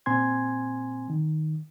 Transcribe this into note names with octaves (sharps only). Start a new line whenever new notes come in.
A#2 C4 G#5 C6 G#6
D#3